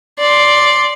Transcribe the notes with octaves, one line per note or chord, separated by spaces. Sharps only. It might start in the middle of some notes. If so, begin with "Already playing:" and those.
D5 C6